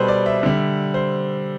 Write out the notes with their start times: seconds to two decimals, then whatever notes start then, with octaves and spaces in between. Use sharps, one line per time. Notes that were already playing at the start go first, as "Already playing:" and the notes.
Already playing: B2 G3 A4 B4 C5
0.08 D5
0.26 E5
0.43 D3 G3
0.94 C5